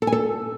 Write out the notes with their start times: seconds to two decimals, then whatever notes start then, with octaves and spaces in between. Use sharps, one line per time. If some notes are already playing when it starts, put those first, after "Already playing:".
0.02 A4
0.07 G#5
0.12 A4